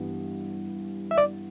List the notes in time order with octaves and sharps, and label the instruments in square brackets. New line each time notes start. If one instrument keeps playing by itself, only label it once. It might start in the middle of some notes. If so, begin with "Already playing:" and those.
Already playing: [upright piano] G2 E3 B3
[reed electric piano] E5
D5